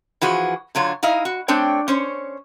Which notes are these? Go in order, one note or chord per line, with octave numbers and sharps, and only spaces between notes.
E3 F3 F#4 G#4
D3 F#3 F4 C#5
D#4 E4 D#5 F5
F#4
A3 C4 D4 C#5 G5
C#4 C5 C#5